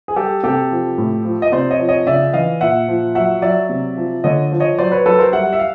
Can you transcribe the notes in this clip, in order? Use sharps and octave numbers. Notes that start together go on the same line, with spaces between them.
G#4
G3 G4 A4
C3 G4 A4
F3
A2
F3
D#5
C3 C5 D5
C#5 D#5
F3
C#5 D#5
C#3 D5 E5
E3 D#5 F5
A#2 E5 F#5
F3
F#3 E5 F#5
F#3 D5 E5
C3
F3
D3 C#5 D#5
F3
C#5 D#5
F#3 C5 D5
B4 C#5
F#3 A4 B4
A#4 C5
G3 E5 F#5
E5
F5